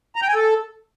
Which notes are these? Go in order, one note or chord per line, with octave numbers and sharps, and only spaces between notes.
A#5
G5
G#5
A4